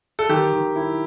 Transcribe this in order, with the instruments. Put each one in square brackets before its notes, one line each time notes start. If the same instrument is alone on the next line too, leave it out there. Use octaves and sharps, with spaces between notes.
[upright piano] A4
[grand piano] D#3 [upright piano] G4
[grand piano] D#3
E4